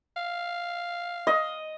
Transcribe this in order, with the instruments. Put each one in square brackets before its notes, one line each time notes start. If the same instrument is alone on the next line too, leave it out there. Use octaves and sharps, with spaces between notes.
[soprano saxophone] F5
[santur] D#5